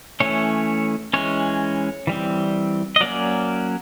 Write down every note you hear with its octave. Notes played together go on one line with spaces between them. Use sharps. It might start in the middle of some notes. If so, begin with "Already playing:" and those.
E3 A3 C#4 C#5
E3 G#3 C#4 C#5
E3 G3 C4
D#5
F#3 A#3 C#4 D5